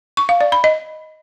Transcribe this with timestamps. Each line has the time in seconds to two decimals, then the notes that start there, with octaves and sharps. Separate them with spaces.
0.17 C#6
0.29 F5
0.41 D5
0.52 B5
0.64 D#5